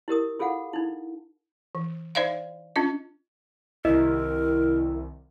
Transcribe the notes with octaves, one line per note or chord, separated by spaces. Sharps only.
E4 G4 A#4 D#6
F4 G#4 A4 F5 F#5
D#4 E4
E3
D#4 C5 D5 E5 F5
C#4 D4 F4 D#5
C2 D#3 E4 A#4 D#5